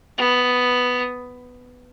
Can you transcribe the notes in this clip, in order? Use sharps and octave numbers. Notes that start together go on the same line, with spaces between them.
B3